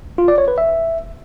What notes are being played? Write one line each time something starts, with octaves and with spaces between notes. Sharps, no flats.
F4
D5
C#5
B4
E5